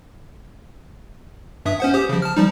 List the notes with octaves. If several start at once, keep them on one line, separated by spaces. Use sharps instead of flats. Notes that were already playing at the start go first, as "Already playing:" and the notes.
G2 E5 D#6
C#4 C5 F#5
G4 C5 D#6
C#3 F3
A5 F6
F3 G3 D#4